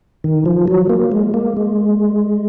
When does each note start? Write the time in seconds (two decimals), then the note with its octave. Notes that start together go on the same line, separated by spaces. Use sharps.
0.24 D#3
0.46 F3
0.68 F#3
0.90 A#3
1.12 G#3
1.34 A#3
1.57 G#3